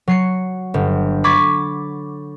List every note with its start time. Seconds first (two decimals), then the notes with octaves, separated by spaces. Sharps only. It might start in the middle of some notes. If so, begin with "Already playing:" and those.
0.08 F#3 C7 C#7
0.74 G1
1.24 B5 C#6 D6 G#6 A6 B6